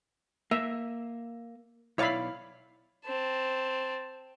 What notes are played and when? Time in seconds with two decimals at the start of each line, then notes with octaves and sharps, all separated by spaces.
0.51 A#3 E5
1.98 B1 E4 C#5 D5 F5 B5
3.06 C4 A5